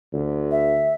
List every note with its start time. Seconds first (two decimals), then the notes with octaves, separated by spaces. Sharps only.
0.13 D2
0.51 E5